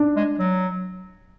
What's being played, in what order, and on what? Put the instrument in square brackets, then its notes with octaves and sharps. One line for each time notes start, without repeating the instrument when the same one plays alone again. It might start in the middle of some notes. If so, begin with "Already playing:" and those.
Already playing: [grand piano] D4
[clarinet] G#3
F#3